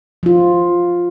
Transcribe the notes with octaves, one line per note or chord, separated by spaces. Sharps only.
F3 F4